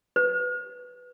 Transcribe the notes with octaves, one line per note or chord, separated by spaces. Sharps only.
B4